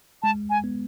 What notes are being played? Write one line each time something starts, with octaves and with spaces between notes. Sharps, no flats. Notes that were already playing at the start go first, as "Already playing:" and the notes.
G#3 A5
G#5
B3